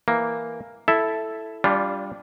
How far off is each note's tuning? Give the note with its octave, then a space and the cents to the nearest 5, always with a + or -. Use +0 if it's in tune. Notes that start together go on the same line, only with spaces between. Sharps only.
E3 +0 A#3 +0
E4 +0 A4 -5 E5 +0
G3 +5 D4 -25 F4 +0